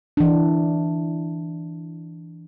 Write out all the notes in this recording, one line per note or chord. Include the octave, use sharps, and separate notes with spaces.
E3 D4